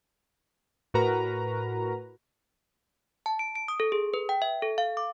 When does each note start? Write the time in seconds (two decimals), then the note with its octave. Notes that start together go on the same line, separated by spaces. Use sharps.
0.94 A2 F#4 A#4 B4 A#5
3.26 A5
3.39 D7
3.55 D7
3.68 D#6
3.80 A4
3.92 G#4
4.14 B4
4.29 G5
4.42 E5
4.62 A4
4.78 F5
4.97 D6